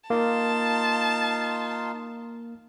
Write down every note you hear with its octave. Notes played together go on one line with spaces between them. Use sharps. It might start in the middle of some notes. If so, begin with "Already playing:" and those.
A#3 D#4 F4 A5 C6